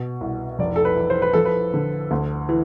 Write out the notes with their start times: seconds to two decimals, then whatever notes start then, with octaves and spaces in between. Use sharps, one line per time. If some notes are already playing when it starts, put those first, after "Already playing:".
Already playing: B2
0.21 C2
0.59 F1 D5
0.76 A4
0.85 B4
0.97 E3
1.10 C5
1.22 B4
1.33 F3 A4
1.45 B4
1.74 D3
2.11 D2
2.49 E3